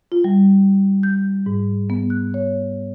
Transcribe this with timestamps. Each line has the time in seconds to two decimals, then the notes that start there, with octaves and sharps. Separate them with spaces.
0.12 F4
0.24 G3
1.03 G6
1.46 G#2
1.90 B3
2.10 F#6
2.34 C#5